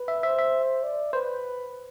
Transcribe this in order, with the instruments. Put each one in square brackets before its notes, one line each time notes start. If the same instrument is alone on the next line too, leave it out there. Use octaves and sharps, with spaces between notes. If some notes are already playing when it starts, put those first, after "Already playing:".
Already playing: [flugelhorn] B4
[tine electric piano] E5
[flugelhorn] C5 [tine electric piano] E5
[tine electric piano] E5
[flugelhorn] D5
[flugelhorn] B4 [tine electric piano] C5